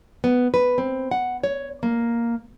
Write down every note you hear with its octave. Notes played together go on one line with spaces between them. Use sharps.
B3
B4
C4
F#5
C#5
A#3